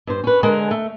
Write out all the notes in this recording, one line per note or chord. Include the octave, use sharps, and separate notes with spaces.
G2 C5
C#4 B4
D3 G#3 A#4 G#5
A3